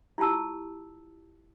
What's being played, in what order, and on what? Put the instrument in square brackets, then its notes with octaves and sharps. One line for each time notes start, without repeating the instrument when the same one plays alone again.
[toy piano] E4 F4 G4 A5 E6